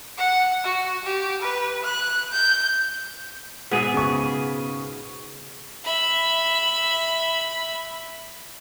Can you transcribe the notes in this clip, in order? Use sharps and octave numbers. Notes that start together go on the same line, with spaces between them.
F#5
F#4
G4
B4
F#6
G6
G#2 B2 B3 G#4 E5
C#3 C#6
E5 B5